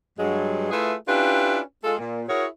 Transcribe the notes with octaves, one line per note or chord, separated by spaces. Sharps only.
G2 F#3 G#3
A3 E4 F4 G#4 B4 E5
C#4 D4 E4 F4 G4 B4
G#3 F4 A4
A#2
E4 F#4 G#4 A#4 C#5